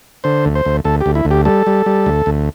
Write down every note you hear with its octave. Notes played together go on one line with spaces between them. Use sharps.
D3 C5
D2
C5
D2
D2 A4
D2 G4
E4
D2
G4
G3 A4
G3
G3
D2
D2